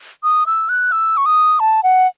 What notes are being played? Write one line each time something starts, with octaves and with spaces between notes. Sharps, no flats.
D#6
E6
F#6
E6
C#6
D#6
A5
F#5